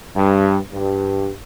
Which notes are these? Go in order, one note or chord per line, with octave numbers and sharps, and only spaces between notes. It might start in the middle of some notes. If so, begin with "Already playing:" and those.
G2
G2